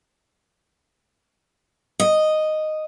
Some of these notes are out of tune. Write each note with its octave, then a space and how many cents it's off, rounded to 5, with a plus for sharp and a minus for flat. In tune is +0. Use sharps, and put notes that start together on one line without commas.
D#5 -5